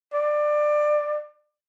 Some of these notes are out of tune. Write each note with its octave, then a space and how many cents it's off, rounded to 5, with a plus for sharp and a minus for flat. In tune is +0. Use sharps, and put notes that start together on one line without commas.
D5 +20